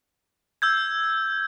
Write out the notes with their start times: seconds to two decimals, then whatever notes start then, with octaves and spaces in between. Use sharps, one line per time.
0.62 E6 G6 G#6